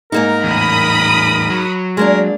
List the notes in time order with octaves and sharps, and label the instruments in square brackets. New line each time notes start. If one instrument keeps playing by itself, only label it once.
[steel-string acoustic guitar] G#2 A#3 D#4 [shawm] A#4
[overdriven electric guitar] E2 A2 [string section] B5 D#6
[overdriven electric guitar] F#3
[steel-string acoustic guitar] G#3 A#3 D4 [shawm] A#4